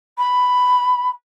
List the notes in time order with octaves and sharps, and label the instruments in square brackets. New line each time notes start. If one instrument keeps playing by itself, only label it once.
[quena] B5